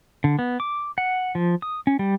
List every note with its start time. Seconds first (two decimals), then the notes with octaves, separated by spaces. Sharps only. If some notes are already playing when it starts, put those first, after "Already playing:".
0.24 D3
0.39 B3
0.60 D6
0.98 F#5
1.35 F3
1.62 D#6
1.87 C#4
1.99 G3